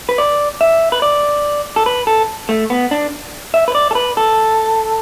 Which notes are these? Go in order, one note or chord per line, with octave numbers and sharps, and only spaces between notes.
B4
D5
E5
B4
D5
A4
B4
A4
A3
B3
D4
E5
B4
D5
A4
B4
A4